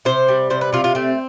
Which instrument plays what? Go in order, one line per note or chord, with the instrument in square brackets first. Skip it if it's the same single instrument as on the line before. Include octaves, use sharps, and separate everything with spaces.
[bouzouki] C3 C5
G3
C3 C5
B4
C3 F4
F4
A3 C4